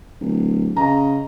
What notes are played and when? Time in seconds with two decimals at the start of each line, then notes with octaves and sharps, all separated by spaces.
0.21 D1
0.76 C#3 D#5 A#5